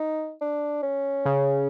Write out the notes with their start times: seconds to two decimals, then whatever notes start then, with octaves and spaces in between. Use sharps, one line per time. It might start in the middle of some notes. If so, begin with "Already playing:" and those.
Already playing: D#4
0.41 D4
0.83 C#4
1.25 C#3